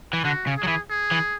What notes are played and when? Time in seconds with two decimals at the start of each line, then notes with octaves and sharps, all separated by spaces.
0.13 E3
0.25 D3 F#4
0.47 C#3
0.57 G#4
0.63 F#3
0.68 E3
0.90 G#4
1.11 E3